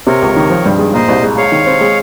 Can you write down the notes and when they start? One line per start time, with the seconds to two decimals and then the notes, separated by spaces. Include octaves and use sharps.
0.07 C3 A#4 C#5
0.22 C#2
0.36 D#3
0.50 F3
0.66 G2
0.79 G#3
0.94 A#2 C5 D#5
1.08 C2
1.23 G#3
1.37 G#3 C#5 F5
1.52 D#3
1.66 C4
1.81 G#3